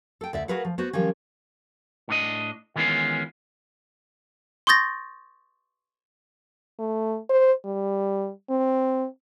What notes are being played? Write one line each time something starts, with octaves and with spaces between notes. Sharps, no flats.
A4 G5
D2 D5 E5
F#4 G#4 A#4 B4 F5 F#5
F3
B3 F#4 C5
D#3 F3 G3 C#4
A2 D4 D#5
D#3 E3 G#3 B3 C#4 F4
C6 C#6 D#6 G6 A6 A#6
A3
C5
G3
C4